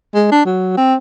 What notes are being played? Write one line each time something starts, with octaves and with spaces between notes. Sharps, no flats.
G#3
D4
F#3
C4